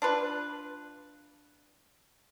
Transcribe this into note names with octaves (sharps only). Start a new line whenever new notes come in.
D4 F4 B4